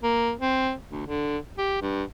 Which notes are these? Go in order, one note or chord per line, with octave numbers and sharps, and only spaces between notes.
A#3
C4
D2
D3
G4
G2